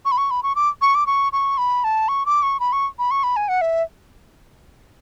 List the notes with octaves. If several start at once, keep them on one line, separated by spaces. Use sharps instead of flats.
C#6
B5
C#6
B5
C#6
D6
C#6
D6
C#6
C#6
B5
A5
C#6
D6
C#6
B5
C#6
B5
C#6
B5
G#5
F#5
E5